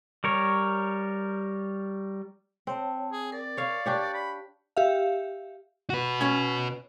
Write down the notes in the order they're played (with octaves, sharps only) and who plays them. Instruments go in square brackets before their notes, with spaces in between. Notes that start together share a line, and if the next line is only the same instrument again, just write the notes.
[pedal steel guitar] G3 A#4 C#5
[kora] C4 [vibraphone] C#5 G5 A5
[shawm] G#4
[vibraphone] A#4 [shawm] D5
[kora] C#5 F5
D4 G4 C#5
[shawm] B5
[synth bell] G4 E5 F5
[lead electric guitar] F#4 B4
[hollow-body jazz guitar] C#4 G#5